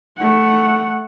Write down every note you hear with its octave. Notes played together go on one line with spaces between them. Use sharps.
A3 F#5